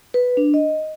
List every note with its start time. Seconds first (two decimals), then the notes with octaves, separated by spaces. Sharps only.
0.14 B4
0.37 D4
0.54 D#5